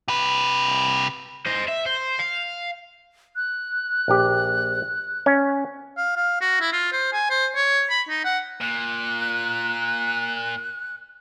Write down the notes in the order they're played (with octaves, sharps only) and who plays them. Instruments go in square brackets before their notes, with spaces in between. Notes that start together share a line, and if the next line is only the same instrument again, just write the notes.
[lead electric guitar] C3 B4
[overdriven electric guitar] C5 D#5
E5
C5
F5
[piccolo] F#6
[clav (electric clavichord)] A#1 G4
C#4
[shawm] F5
F5
F#4
E4
F4
C5
G#5
C5
C#5
B5
D#4
F#5
[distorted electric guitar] A#2 [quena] F#6